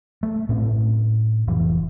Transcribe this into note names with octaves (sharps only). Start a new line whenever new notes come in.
A3
A2 C4 C#4
F1 E3